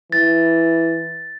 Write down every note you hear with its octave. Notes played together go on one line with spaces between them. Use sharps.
E3 A6